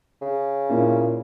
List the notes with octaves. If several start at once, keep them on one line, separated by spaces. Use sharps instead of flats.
C#3
A#2 A#3 C#4 E4